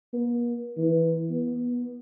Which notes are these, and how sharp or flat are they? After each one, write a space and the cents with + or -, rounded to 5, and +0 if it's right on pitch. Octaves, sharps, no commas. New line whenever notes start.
A#3 +45
E3 +0
B3 -20